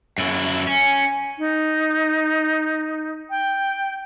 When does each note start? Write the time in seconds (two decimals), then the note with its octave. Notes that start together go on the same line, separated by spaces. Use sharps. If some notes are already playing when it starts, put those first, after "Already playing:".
0.18 F#2 E4
0.67 C#4
1.38 D#4
3.30 G5